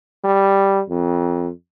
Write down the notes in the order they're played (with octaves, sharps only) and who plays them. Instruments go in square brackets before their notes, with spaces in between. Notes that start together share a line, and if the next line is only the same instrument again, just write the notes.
[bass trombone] G3
F2